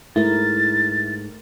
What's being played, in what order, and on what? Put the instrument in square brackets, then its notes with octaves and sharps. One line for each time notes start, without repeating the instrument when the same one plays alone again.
[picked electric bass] G#2 [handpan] A3 A#4 [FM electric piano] E4 [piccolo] A6